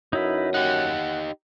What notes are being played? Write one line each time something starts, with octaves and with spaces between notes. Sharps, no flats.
F#2 D#4 E4 B4
D#4 G4 F#5